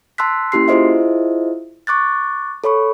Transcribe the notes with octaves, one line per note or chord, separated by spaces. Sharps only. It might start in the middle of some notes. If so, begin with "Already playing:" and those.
A5 C6 E6 F#6 B6
A#3 C#4 E4 G4 C6 C7
E4 F4 G#4 C5 D#5 E5
C#6 D6 F#6 A6
A4 C#5 B5 C#6